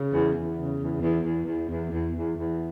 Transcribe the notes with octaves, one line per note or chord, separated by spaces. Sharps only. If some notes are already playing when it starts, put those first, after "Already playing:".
Already playing: C#3
E2
E2
C#3
E2
E2
E2
E2
E2
E2
E2
E2